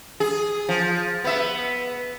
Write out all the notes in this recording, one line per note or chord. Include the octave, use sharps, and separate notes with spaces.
G#4
F3
B3 E5